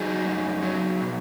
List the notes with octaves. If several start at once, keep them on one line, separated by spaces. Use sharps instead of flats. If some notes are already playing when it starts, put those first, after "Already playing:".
Already playing: F#3 D#4 G#4
F#2
F#3
B2